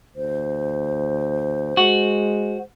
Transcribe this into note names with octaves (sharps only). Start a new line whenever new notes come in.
D2 C5
G#3 F#4